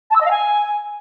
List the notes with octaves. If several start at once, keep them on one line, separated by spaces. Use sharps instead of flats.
A5
E6
D#5
F5
G#5